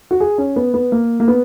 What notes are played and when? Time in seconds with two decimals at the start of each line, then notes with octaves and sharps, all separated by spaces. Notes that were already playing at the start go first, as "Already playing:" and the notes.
0.11 F#4
0.20 G#4
0.38 C#4
0.56 B3
0.74 B3
0.92 A#3
1.20 A#3
1.28 B3